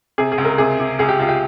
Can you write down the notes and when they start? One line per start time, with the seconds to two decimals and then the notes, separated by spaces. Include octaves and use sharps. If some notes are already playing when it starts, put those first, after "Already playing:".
0.18 C3 G#4
0.32 G#4
0.38 C#2
0.45 A#4
0.58 C3 G#4
0.79 C3
0.99 C#2 G#4
1.09 G4
1.19 C#2 F4
1.29 G4